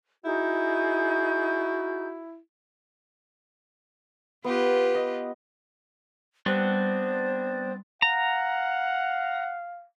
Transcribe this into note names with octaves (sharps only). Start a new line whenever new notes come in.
D#4 E4 F#4 G#4 G6
B3 F4 G4 B4
D#5
G3 B3 C4 D4 C5
F5 F#5 A#5